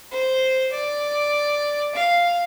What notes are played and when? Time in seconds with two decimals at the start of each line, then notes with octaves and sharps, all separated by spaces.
0.12 C5
0.73 D5
1.95 F5